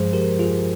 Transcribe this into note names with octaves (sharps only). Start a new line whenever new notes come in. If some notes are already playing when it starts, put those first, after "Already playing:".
Already playing: G2 F3 G#3 G#4 C5
G4 A#4
F4 G#4